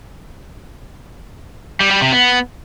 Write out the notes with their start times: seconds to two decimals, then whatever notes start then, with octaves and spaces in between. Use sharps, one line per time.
1.80 G3
1.91 G3
2.02 C3
2.12 B3